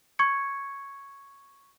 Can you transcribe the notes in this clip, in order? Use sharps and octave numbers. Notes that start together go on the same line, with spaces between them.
C#6 G#6 C#7